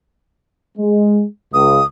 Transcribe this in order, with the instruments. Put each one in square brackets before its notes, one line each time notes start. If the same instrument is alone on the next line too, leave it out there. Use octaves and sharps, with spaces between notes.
[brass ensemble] G#3
[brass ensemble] C#2 [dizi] D#6